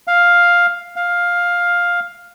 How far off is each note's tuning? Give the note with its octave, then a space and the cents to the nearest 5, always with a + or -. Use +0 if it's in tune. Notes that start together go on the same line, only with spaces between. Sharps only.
F5 +5
F5 +10